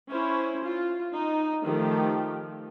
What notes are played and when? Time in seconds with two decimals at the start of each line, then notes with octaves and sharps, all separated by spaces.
0.10 C#4 E4 C5
0.63 F4
1.14 D#4
1.63 D#3 F3 A3 G4